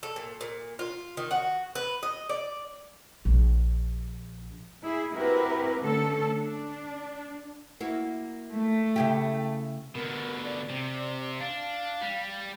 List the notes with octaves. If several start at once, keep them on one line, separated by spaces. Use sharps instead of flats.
A4
A#2
A#2
F4
D#3
F#4
B4
D#5
D5
A#1
E4 G#4
C4 E4 F#4 G4 A#4 B4
D3 A3 C#4 A4
D4
A#3 E4 F#4
A3
C#3 E4 G4
B2 D3 A#4
D5
C3
D4 F5
G3